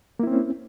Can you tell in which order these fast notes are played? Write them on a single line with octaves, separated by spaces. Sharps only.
A#3 E4 C4 C#4